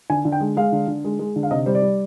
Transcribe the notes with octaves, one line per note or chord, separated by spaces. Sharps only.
D3 G#5
D3
G5
G#3
G#3 F5
D3
D3
G#3
G#3
D3
F5
C3 D#5
G3 C5
D5
G3